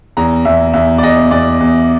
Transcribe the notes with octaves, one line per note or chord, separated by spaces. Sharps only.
E2 A#5
E2 E5
E2 E5
D5
E2 D#5
E2 D5
E2